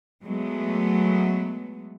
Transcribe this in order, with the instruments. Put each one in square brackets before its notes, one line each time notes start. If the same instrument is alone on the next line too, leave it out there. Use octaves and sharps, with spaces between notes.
[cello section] F#3 G#3 A3 B3